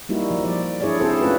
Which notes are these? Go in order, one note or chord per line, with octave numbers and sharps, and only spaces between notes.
G3 A#3 D#4 E4 F#4
F3
D5
D4 E4 G#4 C#5 D5
C4 E4 F#4 G#4 A4 C5
A3 C#4 F4 B4